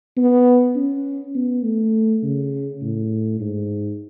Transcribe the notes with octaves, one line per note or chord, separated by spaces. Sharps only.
B3
C#4
B3
A3
C#3
A2
G#2